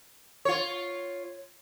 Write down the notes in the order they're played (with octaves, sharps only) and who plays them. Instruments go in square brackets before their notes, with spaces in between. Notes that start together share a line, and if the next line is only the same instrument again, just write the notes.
[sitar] F4 C#5